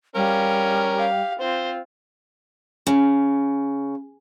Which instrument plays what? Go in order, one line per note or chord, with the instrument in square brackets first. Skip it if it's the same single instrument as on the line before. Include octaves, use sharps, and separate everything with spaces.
[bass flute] G3 [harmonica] C#4 A#4 [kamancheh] F5
[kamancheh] G4 F5
[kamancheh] C4 F4 [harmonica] C5
[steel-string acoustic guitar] C#3